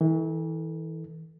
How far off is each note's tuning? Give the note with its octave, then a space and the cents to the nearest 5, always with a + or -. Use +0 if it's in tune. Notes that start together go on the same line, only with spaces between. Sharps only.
E3 -35 A4 +0